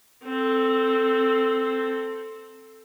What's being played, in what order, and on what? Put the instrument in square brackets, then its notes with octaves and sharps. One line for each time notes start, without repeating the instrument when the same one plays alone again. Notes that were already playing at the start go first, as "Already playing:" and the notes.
[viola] C4 A4